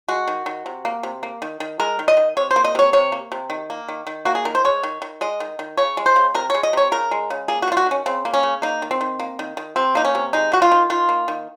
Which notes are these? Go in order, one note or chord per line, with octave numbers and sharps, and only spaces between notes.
G#3 F#4
D#3
D#3
C3
A#3
C3
A#3
D#3
D#3
G#3 A#4
D#3
D#5
D#3
C3 C#5
C5
A#3
D#5
C3 C#5
C3 C#5
A#3
C3
D#3
A#3
D#3
D#3
A#3 F#4
G#4
D#3 A#4
C5
G#3 C#5
D#3
D#3
G#3 D#5
D#3
D#3
C#3 C#5
G#3
C5
C#3
C3 A#4
G#3 C#5
D#5
C3 C#5
C#3 A#4
G#3
C#3
A#3 G#4
F#4
D#3 F4
F#4
D#3 C#4
C#3 C4
A#3
C#4
C#3
A#3 D#4
D#3
C4
D#3
A#3
D#3
D#3
C3 C4
A#3 D#4
C#4
C3
G#3 D#4
D#3 F#4
F4
D#3
D#3 F4
A#3
D#3